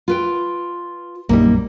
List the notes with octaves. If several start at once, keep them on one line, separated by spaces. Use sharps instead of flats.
F4 B4 G5
A#1 F#2 G3 A#3 D#4